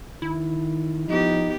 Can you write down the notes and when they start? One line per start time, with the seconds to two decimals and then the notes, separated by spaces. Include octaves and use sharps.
0.22 D#3 E4
1.08 F3 B3 D#4 G4